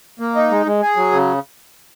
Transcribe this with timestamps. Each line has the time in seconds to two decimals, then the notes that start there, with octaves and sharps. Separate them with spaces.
0.20 A#3
0.35 D#4
0.51 G#3
0.66 G#3
0.81 G#4
0.96 F#3
1.12 C#3